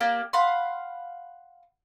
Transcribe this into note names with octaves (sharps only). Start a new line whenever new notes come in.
A#3 G4 D5
F5 F#5 B5 C6